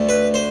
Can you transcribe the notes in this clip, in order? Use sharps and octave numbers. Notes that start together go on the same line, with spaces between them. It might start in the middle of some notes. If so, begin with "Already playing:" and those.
Already playing: D2 D3 A3
B4
C5